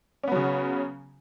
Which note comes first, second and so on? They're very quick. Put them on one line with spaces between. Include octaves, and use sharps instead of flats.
C#4 B3 F#3 C#3